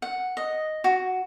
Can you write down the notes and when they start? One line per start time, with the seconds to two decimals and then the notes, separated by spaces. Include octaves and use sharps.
0.02 F#5
0.37 D#5
0.84 F#4